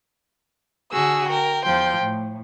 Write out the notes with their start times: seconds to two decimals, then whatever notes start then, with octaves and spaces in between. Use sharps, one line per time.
0.92 D3 F#4 G#4 E6
1.28 A#4 G5
1.65 E2 F3 G5 C6
1.98 A2